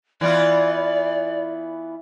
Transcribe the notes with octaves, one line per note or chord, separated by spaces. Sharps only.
E3 B3 F4 D5